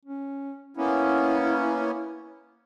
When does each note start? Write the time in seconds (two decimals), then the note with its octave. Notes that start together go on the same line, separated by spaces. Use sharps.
0.06 C#4
0.77 A#3 B3 C#4 E4